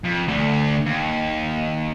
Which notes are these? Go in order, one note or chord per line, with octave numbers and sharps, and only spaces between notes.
F2
D2 D3
D#2